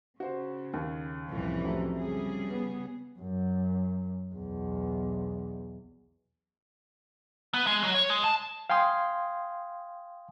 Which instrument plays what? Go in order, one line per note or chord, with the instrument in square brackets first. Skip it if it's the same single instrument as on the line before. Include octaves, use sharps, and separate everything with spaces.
[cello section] C#3 [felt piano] F#4 C5
[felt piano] D#2
[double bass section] C2 F2 A2 [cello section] E3 C#4
[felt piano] C3 F#3 A3
[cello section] C#3 G3 G#4
[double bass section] B3
[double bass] F#2
B1 E2
[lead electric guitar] B3
G#3
F#3
C#5
G#3
A5
[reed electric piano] F5 G5 G#5 C6 D#6